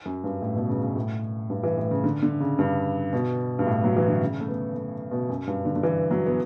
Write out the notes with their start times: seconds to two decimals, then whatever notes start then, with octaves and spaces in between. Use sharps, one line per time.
0.05 F#2
0.24 G2
0.42 A2
0.56 B2
0.69 C#3
0.82 C#3
0.96 A2
1.50 G2
1.63 E3
1.77 A2
1.91 C#3
2.04 D3
2.23 D3
2.40 C#3
2.59 G2
3.13 B2
3.59 G2
3.67 A2
3.84 F#3
3.96 E3
4.08 D3
4.21 C#3
4.40 A3
4.48 B3
4.75 A3
5.11 B2
5.29 F#2
5.47 G2
5.65 D3
5.76 D3
5.83 E3
6.11 F#3
6.26 B3